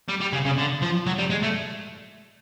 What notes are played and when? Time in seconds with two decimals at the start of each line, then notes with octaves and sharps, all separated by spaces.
0.08 G3
0.21 G3
0.33 C#3
0.45 C#3
0.58 D3
0.82 F3
1.06 F#3
1.18 G3
1.30 G#3
1.43 A3